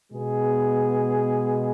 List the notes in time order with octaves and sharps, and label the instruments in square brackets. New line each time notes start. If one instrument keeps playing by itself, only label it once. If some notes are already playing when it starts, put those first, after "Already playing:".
[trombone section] B2 G#3 B3 G#4